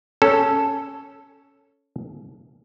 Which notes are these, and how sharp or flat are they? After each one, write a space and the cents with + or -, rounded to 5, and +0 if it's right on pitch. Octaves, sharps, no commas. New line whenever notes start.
C#4 +5 A4 +0